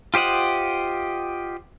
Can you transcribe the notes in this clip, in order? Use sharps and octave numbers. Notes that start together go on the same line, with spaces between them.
F4 G4 C5 D#5 F#5